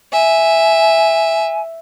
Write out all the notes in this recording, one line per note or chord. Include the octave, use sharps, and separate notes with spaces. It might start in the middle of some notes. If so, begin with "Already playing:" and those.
E5 G#5